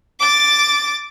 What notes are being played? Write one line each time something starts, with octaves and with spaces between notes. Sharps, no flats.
D6 A6